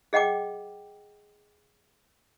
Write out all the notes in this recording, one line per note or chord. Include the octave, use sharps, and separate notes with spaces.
G#4 D#5 F#5 G5 D6